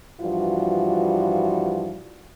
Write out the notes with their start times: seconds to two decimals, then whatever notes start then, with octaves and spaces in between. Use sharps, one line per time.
0.20 G2 E3 F3 G3 F4 F#4